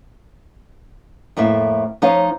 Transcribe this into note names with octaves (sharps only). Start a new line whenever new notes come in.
F2 A2 A#3 E5
F3 D#4 C#5 F5